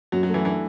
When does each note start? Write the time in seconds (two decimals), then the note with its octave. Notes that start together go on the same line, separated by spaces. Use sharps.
0.12 F#2 F#3
0.23 F#3
0.29 E3 A3
0.45 E3 D4